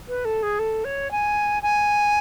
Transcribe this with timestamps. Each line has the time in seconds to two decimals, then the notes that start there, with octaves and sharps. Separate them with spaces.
0.08 B4
0.25 A4
0.43 G#4
0.59 A4
0.85 C#5
1.11 G#5
1.62 G#5